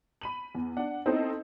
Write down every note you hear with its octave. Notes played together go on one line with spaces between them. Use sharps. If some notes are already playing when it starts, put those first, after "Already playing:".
B5 D#7 F#7
E2
D4 F#5
C4 D#4 E4 A4 C5 D#5